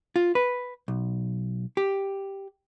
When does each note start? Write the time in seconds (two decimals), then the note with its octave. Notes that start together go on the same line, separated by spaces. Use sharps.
0.16 F4
0.35 B4
0.88 B1
1.77 G4